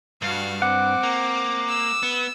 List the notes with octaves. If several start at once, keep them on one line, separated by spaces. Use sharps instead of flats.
G2 F#4 F5
C4 F#5 D6
A#3
E6
B3